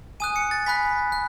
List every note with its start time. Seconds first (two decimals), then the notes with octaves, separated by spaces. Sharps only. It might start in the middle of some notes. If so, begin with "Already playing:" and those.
0.20 G#5 D#6 F#6 D#7
0.36 C#7
0.51 A6
0.66 G#5 B5 F#6 B6
1.12 F#6